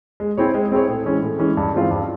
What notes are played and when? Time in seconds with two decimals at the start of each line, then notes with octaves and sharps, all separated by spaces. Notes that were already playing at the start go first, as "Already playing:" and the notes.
0.20 G#3
0.37 C4 E4 G#4 C#5
0.54 G#3
0.72 C4 E4 G#4 C#5
0.88 A2
1.05 E3 G#3 C#4
1.22 A2
1.39 E3 G#3 C#4
1.57 G2
1.73 E3 G#3 C4 F4
1.91 G2